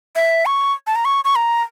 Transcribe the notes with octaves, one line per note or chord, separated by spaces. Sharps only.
E5
C#6
A5
A#5
C#6
C#6
A#5